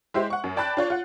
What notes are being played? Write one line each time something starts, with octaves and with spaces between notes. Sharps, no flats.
G#3 E4 G4 C5 E5
F#5 C#6
F#2
D5 G5 A5 B5 F#6 A6
D4 F4 C#5
F4 F#5